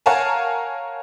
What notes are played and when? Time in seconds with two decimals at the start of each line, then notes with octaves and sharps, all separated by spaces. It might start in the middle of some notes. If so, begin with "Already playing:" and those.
0.06 A#4 C#5 F5 F#5 G#5 A5